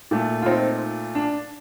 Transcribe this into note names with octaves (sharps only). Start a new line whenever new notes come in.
A#2 A3
F4
C4 D#4
D4